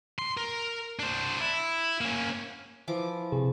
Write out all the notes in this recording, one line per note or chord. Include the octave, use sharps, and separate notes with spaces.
C6
A#4
D4 C5
E4
A#3 C#4
E3 F3 D6
C3 G#4